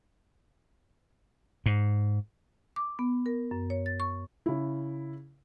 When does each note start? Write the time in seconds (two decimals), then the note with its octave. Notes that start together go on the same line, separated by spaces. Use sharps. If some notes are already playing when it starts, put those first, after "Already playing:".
1.66 G#2
2.76 D6
2.99 B3
3.26 A#4
3.51 F#2
3.70 C#5
3.86 A6
4.00 C#6
4.46 C#3 E4